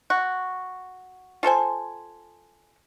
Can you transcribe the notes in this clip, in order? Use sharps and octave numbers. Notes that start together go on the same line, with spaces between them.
F#4
F4 A4 C5 G#5